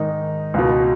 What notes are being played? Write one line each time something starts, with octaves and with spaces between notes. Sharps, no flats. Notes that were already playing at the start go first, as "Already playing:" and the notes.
Already playing: G#2 D#3 D#4
C#2 B2